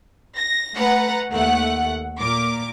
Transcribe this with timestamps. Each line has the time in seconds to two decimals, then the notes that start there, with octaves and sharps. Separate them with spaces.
0.36 A#6
0.76 A3 B4 F#5 A#5
1.31 D#2 A3 F#5
2.19 A#2 A#4 D6